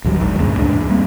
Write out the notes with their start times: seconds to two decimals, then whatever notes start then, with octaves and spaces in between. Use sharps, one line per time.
0.04 A#1 D#2 F#3 G3
0.21 G#1 G#2 D#3
0.39 D2 G2 A#2 C#3
0.58 C#2 G#2 D4
0.71 E2
0.89 G3 A#3 C4